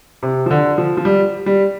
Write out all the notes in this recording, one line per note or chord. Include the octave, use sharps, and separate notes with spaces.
C3
F3
D3
F3
F3
G3
G3